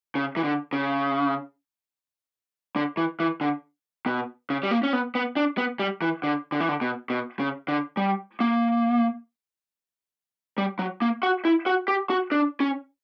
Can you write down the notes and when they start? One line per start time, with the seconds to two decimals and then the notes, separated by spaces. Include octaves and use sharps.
0.15 C#3
0.37 E3
0.44 D3
0.73 C#3
2.76 D3
2.97 E3
3.20 E3
3.41 D3
4.06 B2
4.50 C#3
4.63 G3
4.71 A#3
4.83 C#4
4.93 B3
5.15 B3
5.36 D4
5.58 B3
5.80 G3
6.02 E3
6.24 D3
6.52 D3
6.60 E3
6.69 D3
6.81 B2
7.10 B2
7.40 C#3
7.68 D3
7.97 G3
8.40 A#3
10.58 G3
10.79 F#3
11.02 A#3
11.23 F#4
11.45 E4
11.66 F#4
11.88 G4
12.10 F#4
12.32 D4
12.60 C#4